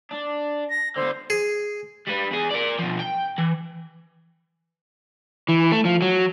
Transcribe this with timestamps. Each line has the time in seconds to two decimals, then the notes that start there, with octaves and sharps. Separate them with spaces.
0.11 D4
0.70 A#6
0.96 D3 B3 C5
1.30 G#4
2.08 G3 B4
2.31 E2 G#4
2.51 A#4 D5
2.79 B2 F3
2.99 G5
3.38 E3
5.49 E3
5.72 A3
5.85 F3
6.02 F#3